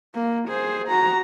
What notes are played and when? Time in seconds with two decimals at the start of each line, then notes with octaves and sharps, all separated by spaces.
0.15 A#3
0.49 G#4 C5
0.88 F#4 A#5